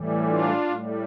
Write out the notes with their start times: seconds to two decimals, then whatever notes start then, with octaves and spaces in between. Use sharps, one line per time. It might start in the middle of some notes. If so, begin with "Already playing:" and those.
Already playing: A2 E3 G3
0.26 D4 F4
0.66 A2 G3